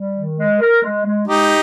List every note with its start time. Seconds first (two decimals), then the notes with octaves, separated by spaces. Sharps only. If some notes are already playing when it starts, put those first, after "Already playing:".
Already playing: G3
0.15 D#3
0.38 G#3
0.60 A#4
0.83 G#3
1.05 G#3
1.28 G#3 D#4 G4